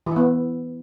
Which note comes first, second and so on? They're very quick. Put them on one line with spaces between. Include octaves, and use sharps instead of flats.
E3 E4 B3